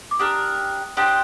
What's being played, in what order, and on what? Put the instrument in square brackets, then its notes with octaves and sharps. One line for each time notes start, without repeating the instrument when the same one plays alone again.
[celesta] D6
[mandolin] D4 G4 A#4 [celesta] D#6
[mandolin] D4 G4 C5 [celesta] D#6